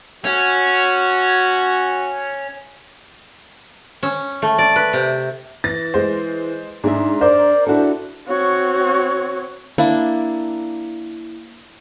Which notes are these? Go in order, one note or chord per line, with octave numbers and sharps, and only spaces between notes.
C#4 F#4
C#4
A3
D5
B4
C3
E3 A6 A#6
G#3 C5
G#2 D4 G#4 E5
A#4 C5 D5
D4 E4 F#4 A4
C4 F#4 C#5
A#3 D4 E4